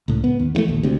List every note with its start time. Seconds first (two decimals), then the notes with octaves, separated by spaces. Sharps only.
0.08 C#2 A2
0.24 B3
0.39 D#2
0.55 G2 E3 A3
0.68 A#1 D#2
0.83 D2 C3